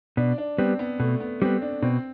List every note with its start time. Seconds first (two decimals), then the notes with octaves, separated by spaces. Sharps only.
0.17 B2 D4
0.38 D4
0.58 G3 B3 C4
0.79 B3
1.00 B2 A3
1.20 B3
1.41 G3 B3 C4
1.62 D4
1.82 B2 C4